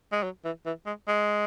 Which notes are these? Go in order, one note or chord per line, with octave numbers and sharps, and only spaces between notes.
G#3
F#3
E3
E3
G#3
G#3